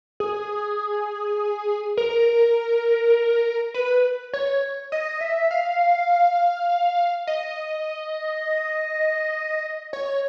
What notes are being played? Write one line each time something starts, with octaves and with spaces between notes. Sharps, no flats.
G#4
A#4
B4
C#5
D#5
E5
F5
D#5
C#5